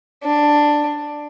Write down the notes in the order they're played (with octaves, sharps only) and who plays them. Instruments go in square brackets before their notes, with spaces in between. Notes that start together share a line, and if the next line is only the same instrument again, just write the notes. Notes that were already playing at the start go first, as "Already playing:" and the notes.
[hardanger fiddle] D4